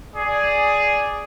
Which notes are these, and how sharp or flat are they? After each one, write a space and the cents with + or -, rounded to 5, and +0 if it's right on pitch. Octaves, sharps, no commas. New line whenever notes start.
G#4 +0 D5 +0